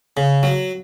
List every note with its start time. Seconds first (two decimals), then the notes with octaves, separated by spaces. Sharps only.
0.17 C#3
0.43 F#3